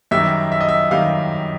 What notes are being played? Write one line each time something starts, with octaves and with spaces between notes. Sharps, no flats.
F#2 D#3 G3 E5
E5
D#5
E5
F#2 D#3 G3 F5